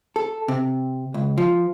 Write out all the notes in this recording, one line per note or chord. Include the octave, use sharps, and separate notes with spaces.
A4
C3
C#2
F3